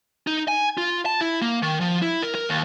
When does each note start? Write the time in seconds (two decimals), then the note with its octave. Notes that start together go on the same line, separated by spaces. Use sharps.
0.27 D#4
0.48 G#5
0.78 F4
1.06 A5
1.21 E4
1.42 A#3
1.62 D#3
1.81 F3
2.02 E4
2.23 A#4
2.35 A#4
2.49 D#2